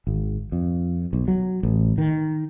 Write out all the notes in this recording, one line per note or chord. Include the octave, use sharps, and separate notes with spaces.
G#1
F2
B1
F#3
A1
D#3